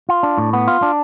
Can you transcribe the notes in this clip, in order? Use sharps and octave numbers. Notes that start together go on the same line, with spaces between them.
F4
D4
A2
B3
F4
D4